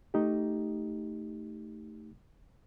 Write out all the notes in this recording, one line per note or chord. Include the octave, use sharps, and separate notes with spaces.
A3 D#4 G4